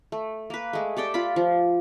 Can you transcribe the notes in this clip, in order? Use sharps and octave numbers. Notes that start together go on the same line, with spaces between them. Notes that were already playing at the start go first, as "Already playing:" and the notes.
A3
A#3 B4
G#3 A3
G4 A4 D5 G5
F4 D5 B5
F3